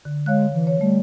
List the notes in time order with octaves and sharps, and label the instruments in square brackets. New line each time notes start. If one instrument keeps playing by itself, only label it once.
[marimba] D3
[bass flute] G#3 [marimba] C#5 F5 F#6
[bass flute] E3
[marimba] C#5
[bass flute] G3 [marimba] A3